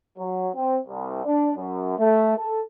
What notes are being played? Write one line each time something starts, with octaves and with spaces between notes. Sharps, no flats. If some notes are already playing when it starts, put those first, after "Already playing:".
F#3
C4
C2
D4
F#2
A3
A4